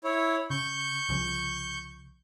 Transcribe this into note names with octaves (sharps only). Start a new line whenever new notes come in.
E4 C#5
C#3 C#6 G6
C2 C#3 F3